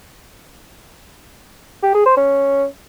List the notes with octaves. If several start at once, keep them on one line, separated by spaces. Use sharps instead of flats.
G4
G#4
C5
C#4